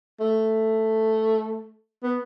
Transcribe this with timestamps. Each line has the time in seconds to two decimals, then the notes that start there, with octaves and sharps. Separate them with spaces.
0.20 A3
2.03 B3